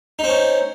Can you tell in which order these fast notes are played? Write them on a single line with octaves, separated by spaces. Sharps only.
D#4 C4 C#4